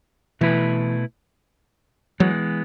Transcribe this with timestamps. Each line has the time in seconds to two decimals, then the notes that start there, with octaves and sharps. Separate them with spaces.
0.41 B2 E3 A3 E4 B4
2.20 E3 F#3 G#3 B3